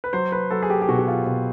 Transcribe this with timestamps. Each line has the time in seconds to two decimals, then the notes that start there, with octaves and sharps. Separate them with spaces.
0.04 B4
0.13 F#3 C5
0.32 B4
0.50 F#3 A4
0.62 G#4
0.70 G4
0.82 G4
0.89 B2 F#4
0.99 F#4
1.08 F4
1.26 B2